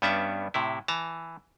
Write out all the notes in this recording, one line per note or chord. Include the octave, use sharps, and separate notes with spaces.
G2 G3 B3 C#4 D4 E5
A2 C3 E4
E3 A5 A#5